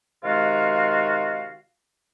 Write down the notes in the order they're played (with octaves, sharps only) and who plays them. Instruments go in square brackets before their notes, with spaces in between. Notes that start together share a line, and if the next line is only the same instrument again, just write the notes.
[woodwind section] C3 D#3 G#3 F4 F#4 F5